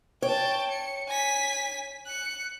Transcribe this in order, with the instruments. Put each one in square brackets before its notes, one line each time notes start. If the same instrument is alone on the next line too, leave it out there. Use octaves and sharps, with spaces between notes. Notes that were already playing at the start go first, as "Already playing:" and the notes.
[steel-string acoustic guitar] C#5 [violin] G5 A5
[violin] C#7
G#5 B6
F#6 C#7